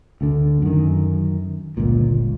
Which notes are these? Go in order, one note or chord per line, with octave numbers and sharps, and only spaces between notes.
D2 D3
F#2 D#3
G1 C#2 A#2